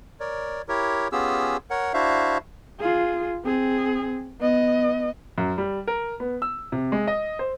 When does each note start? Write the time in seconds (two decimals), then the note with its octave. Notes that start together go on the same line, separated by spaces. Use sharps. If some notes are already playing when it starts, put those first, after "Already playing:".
0.20 A#4 C#5 D5
0.68 E4 G4 A#4 C#5
1.12 B3 C#4 F4 G4 G#4 E6
1.70 A#4 C#5 F#5
1.94 D4 E4 F#4 C5 E5 F5
2.80 F4 G#4
3.44 C4 G#4
4.40 B3 D#5
5.38 F#2
5.58 G3
5.88 A#4
6.20 B3
6.42 E6
6.72 C3
6.92 G#3
7.08 D#5
7.39 C5